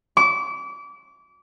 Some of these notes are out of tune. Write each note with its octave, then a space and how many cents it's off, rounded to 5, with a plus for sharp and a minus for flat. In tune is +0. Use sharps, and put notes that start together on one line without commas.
D6 -30